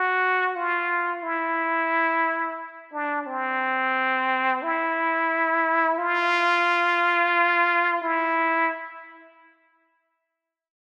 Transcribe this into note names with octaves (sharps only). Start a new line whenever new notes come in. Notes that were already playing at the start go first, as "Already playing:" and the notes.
Already playing: F#4
F4
E4
D4
C4
E4
F4
E4